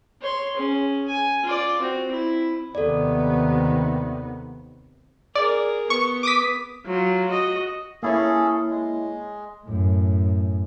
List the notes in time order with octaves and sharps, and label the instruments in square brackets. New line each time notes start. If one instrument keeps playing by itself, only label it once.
[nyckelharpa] C#5 C6
C#4 G#4
G#5
F4 D5
C4 F#4
E4
[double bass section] D#2 C3 [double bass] D#3 B3 [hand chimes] A4 D5
[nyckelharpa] G#4 A#4 [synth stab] D5
[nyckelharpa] B3 [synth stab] C#6
[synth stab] D6 D#6 B6
[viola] F#3 F4
F#4 D#5
[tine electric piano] A#3 E4 C#5 [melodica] C#4 G#4 A4
[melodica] G#3
[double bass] F#2 A2